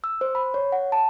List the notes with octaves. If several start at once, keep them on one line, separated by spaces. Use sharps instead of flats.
E6
C5
B5
C#5
F#5
A5